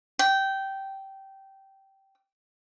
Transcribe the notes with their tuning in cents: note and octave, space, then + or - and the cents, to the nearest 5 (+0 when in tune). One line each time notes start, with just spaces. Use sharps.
G5 -15